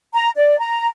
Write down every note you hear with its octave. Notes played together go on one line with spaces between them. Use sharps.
A#5
D5
A#5